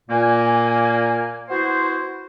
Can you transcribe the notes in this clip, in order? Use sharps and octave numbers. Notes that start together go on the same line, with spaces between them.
A#2 A#3 G#5
B3 E4 F#4 C5